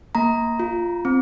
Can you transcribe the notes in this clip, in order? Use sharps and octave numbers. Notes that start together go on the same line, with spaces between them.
A#3 A#5
F4
C4